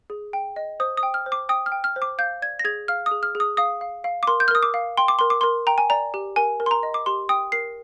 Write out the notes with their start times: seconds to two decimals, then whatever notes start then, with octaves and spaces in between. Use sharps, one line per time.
0.10 G#4
0.33 G5
0.56 D#5
0.80 C5 D#6
0.97 D#6
1.03 G5
1.14 F6
1.26 C5
1.32 D6
1.49 G5 D#6
1.66 F6
1.72 G5
1.84 F6
1.96 C5
2.02 D6
2.18 F5 G6
2.42 D5 G#6
2.59 A#6
2.65 G#4 G#6
2.88 F5 F6
3.06 D#6
3.11 G#4
3.23 F6
3.35 G#4
3.40 D#6
3.57 F5 D#6
3.81 F5
4.04 F5
4.23 D6
4.27 A#4 C6
4.40 G6
4.48 F6
4.51 A#4 D#6
4.63 D6
4.74 F5
4.97 G5 C6
5.08 D6
5.19 A#4 C6
5.30 D6
5.41 A#4 C6
5.67 G5 A#5
5.78 G#5
5.90 D5 A#5
6.14 G4
6.36 A#4 G#5
6.60 A#4
6.66 C6
6.71 A#5
6.83 D#5
6.94 D6
7.06 G4 C6
7.29 G5 D#6
7.52 A#4 C7